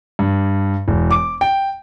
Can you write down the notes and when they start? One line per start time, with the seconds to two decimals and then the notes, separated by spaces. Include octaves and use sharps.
0.19 G2
0.88 E1
1.11 D6
1.41 G5